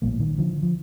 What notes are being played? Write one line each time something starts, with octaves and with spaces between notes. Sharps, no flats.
A#1 A2 G3 A#3
D#3
D3 F3
F3